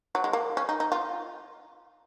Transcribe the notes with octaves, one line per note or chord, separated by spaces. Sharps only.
F#3
G#3
A#3
C#4
D#4
D#4
F4